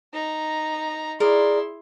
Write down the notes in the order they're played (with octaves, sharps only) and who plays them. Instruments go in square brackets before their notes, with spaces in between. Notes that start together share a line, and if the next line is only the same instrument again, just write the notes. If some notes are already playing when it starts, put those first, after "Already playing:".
[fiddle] D#4 A#5
[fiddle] E4 C6 [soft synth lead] G#4 [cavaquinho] A#4 D5